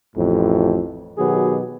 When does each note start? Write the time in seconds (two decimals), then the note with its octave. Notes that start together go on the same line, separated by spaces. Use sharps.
0.16 A1 F2 A2
1.18 B2 D#3 F#3 B3 G4 G#4